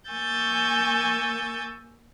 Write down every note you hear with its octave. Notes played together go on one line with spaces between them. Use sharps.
A#3 G#5 C#6 E6 G6 A6